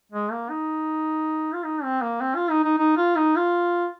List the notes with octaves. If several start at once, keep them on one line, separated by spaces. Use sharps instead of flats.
G#3
A#3
D#4
F4
D#4
C4
A#3
C4
F4
D#4
D#4
D#4
F4
D#4
F4